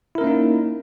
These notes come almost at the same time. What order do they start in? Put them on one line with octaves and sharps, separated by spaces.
E4 A#4 C#4 A#3 D#4